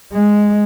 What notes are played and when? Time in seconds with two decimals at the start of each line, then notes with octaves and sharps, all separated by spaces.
0.13 G#3